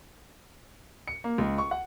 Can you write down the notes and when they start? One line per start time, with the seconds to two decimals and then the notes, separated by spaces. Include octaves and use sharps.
1.08 C#7
1.24 A#3
1.38 C#2
1.58 C#6
1.71 F#5